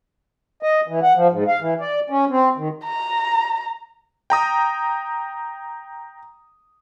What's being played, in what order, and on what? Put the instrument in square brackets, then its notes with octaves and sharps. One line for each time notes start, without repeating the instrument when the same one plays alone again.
[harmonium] D#5
E3
F#5
F3
G#2
F5
E3
D5
C#4
C4
D#3
[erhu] A#5
[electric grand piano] G5 A#5 D#6